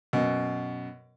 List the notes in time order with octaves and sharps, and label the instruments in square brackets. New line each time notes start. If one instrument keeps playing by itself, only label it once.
[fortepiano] F#2 B2